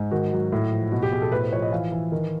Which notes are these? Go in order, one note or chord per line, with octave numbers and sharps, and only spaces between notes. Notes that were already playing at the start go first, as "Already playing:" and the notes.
Already playing: G#2
D#3 F#4
F#3
A2
F3
B2 F#4
G4
B2 G#4
A4
A2 B4
C5
F3 C#5
D#5
E3 F5
E3
D#3